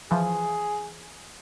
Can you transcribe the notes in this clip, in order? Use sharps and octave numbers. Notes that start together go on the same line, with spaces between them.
E3 F3 G#4